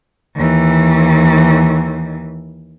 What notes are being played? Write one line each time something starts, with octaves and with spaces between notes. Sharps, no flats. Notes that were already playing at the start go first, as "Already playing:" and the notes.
D#2 E3